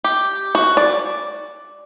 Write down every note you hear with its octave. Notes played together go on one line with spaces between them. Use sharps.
G4
F#4
D5